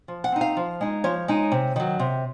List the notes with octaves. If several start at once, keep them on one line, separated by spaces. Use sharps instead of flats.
F3
F#5
C4 D#4
F5
F3
G#3 D#4
F3 C#5
G#3 D#4
C3
D#3 F#3
C3